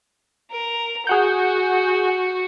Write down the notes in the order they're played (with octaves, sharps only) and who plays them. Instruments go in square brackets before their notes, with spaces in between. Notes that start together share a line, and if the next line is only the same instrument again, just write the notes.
[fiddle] A#4
[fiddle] F#4 [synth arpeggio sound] G#4 F#5 G6